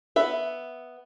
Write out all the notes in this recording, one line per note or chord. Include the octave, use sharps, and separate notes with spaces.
B3 E5